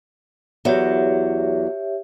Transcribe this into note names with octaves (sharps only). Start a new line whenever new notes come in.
E2 F#3 G4 C#5 E5